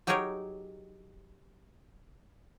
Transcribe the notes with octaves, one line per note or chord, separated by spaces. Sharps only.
F#3 D#4 G4 G#4 A#4 C#5